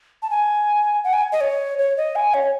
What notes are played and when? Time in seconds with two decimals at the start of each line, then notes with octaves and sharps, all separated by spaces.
0.22 A5
0.30 G#5
1.04 F#5
1.13 G#5
1.32 D#5
1.41 C#5
1.79 C#5
1.97 D#5
2.16 G#5
2.34 C#5